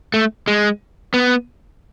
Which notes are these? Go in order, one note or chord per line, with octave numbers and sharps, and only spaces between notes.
A3
G#3
B3